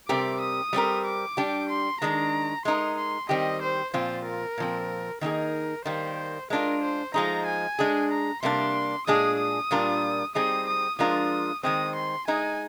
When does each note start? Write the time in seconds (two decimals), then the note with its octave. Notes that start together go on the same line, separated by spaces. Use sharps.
0.09 C3 G3 C4 G4 A#4 D6
0.41 D#6
0.73 G3 C4 G4 A#4
1.05 D6
1.37 G3 D4 G4
1.69 C6
2.01 D#3 G#3 D4 A#5
2.65 G#3 D#4 A#4 C6
2.97 C6
3.29 D#3 G3 C4 G4 D#5
3.62 C5
3.93 A#2 F3 C4 F4 C5
4.25 A#4
4.58 A#2 F3 C4
5.21 D#3 A#3 D#4 G#4 A#4
5.86 D#3 G3 A#3 C5
6.50 G#3 D4 F4 A#4
6.82 C5
7.14 F3 G#3 D#4 A#5
7.46 G#5
7.79 G#3 D4 G#4
8.11 A#5
8.42 C3 G3 A#3 D4 C6
9.07 A#2 G#3 D4 G#4 D#6
9.39 D#6
9.71 A#2 G3 D4 F4 A#4
10.35 G3 C4 D#4 G#4 D#6
10.67 D#6
10.99 F3 G#3 D4 F4 A#4 D#6
11.63 D#3 G#3 C4 D#6
11.95 C6
12.27 G#3 D#4 G#4 G#5